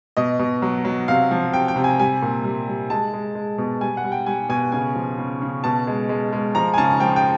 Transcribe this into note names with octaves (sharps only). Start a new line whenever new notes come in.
B2 D#5
B2
F#3
F#3
C3 F5
F3
C3 G5
G5
C3
G#5
G3 G#5
A#2
G3
G3
G#3 A5
G#3
G#3
B2
G3 G#5
F#5
G3
G5
G3 G#5
B2 G#5
C#3 G#5
F3
C#3
C#3
B2 A5
G#3
G#3
G#3
F3 A#5
G#5
C#3 A5
F3 G5
G5